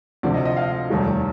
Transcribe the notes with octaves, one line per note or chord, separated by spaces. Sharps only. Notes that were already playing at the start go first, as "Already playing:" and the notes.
D2 C3 F3 D5
D#5
D#5
F5
F1 D#2 D#3 G3